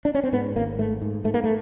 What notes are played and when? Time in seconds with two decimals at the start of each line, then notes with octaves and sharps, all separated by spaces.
0.05 D4
0.15 C#4
0.24 C4
0.32 G#2 B3
0.56 G#1 A#3
0.78 G#2 A3
1.02 G#2
1.24 G#2 A3
1.34 A#3
1.44 A3